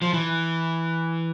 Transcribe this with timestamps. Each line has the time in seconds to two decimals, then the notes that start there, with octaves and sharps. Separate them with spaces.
0.02 F3
0.13 E3